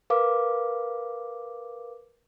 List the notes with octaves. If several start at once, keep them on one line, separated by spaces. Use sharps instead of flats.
A#4 B4 F5 D6